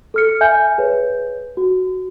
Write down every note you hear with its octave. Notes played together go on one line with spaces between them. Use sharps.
A4 F6 C#7
E5 G#5 G6
G#4 B4 C#5
F#4